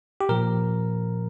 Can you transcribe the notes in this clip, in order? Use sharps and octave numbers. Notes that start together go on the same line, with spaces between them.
G4
A#2 F3 A#4